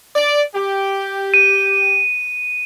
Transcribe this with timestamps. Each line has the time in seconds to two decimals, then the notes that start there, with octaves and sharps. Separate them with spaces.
0.16 D5
0.55 G4
1.34 D#7